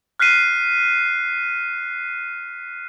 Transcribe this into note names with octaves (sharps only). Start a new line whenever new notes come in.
F6 F#6 B6 C7 D#7